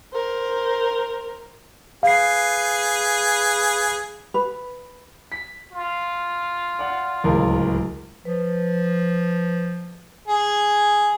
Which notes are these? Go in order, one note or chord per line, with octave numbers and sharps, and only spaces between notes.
A#4 C5
G#4 B4 F5 C7
B4
B6
F4
D5 F#5
D1 C#2 A#4
F3 B4
G#4